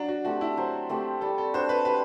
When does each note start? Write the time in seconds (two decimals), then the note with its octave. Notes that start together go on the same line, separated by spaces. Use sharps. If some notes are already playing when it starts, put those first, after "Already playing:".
Already playing: F#3 D4
0.09 F#4
0.25 A3 C4 F#4 G4
0.41 E4
0.57 F#3 C5
0.89 A3 C4 G4
1.21 G3 A4
1.38 A4
1.54 D4 F#4 C5
1.69 B4
1.85 G3 B4